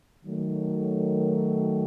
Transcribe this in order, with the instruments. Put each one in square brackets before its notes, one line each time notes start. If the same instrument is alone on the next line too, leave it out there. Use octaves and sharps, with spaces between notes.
[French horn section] D#3 F#3 A3